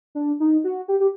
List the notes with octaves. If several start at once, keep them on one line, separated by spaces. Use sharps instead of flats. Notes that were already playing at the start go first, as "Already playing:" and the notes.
D4
D#4
F#4
G4
G4